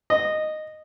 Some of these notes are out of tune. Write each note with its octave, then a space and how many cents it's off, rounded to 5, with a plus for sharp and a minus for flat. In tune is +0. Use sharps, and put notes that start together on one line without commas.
D#5 -10